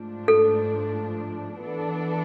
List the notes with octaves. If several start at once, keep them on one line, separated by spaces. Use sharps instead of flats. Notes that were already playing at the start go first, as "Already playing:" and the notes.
Already playing: G#2 F3 A3 D4
A4
E3 B3 D4 A4